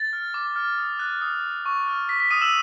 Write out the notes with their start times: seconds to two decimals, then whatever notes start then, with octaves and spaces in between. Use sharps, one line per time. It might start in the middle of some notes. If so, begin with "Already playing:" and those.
Already playing: A6
0.13 F6
0.34 D6
0.56 F6
0.78 D#6
0.99 F#6
1.21 D#6
1.43 F#6
1.66 C#6
1.87 F6
2.09 C#6 B6
2.20 B6
2.30 D#6 F6 D#7
2.41 E6 E7